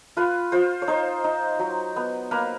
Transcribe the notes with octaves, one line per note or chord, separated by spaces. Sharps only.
F4 B4
F4 C5
C#5
D#4 C5
D#4
F#3
B3
A#3 B4